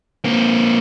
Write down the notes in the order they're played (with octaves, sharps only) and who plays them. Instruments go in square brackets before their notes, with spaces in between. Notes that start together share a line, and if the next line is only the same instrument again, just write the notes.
[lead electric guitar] A#3 C4